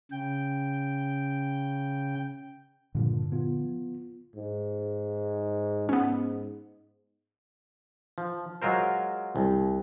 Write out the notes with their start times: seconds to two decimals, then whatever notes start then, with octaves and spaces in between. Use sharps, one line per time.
0.12 C#3 G5
2.95 G2 A#2 D3 F3
3.32 B3 F4
4.36 G#2
5.89 G#2 B3 C#4
8.18 F3
8.62 F#3 G#3 F4 A#4 C5
9.36 C2